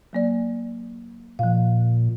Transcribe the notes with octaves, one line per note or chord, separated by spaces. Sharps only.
F#3 A#3 D5
A#2 F3 F5